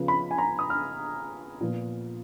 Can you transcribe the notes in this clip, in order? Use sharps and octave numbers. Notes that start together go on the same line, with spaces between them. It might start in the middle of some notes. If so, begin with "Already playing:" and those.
Already playing: C#3 F3 B3
B5
G#5
A#5
D#6
F6
A#2 F3 B3